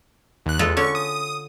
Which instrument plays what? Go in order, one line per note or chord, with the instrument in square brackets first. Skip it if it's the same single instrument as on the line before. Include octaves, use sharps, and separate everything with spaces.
[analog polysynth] D#2 F#6
[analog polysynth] E2 [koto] G#3 F4 A4
[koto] D3 C#4 [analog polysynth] C#6
[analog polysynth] D#6